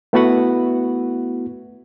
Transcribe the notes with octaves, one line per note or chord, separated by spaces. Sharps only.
A3 B3 E4 F#4 B4 F#5